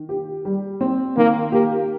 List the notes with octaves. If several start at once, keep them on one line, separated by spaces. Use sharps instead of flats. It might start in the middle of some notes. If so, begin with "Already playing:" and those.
Already playing: D#3
G4
G3
C4
D#3 A#3
A#3 G4